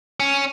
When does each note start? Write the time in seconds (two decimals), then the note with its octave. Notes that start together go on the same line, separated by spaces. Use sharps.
0.20 C#4